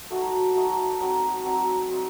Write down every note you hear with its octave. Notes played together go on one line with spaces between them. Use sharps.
F#3 A3 D#4 F#4
F#3 A3 D#4 F#4
F#3 C4 D#4
F#3 C4 D#4
F#3 C4 D#4